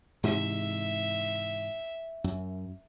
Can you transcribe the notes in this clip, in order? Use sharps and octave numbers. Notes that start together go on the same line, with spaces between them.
G#2 C3 E3 E5
F#2